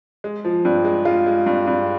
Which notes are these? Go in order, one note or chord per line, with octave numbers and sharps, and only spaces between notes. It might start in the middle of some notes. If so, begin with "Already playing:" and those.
G#3
F3
G2
G#3
G#3 F4
G#3
G2
G2